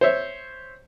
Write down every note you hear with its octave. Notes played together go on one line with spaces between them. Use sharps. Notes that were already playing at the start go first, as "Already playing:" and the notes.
C5 C#5 E5